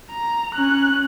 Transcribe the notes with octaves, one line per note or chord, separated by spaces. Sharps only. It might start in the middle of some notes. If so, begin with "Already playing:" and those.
A#5
C#4 F#6